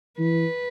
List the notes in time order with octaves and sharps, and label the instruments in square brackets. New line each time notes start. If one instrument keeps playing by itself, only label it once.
[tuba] E3 [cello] B4